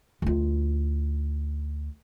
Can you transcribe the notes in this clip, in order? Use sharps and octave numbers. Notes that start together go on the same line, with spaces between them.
D2 F4